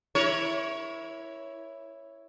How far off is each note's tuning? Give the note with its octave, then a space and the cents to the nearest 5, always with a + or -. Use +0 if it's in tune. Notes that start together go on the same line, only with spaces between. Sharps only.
E4 +0 A#4 +35 C#5 +0